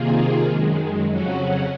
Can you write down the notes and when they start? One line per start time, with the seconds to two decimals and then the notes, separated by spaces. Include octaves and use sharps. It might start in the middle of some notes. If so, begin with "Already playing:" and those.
Already playing: C3 D#3 A#3 F4 G#4
0.45 F#2 D#3 G#3
1.06 F2 C#3 F#3 C#4 F#4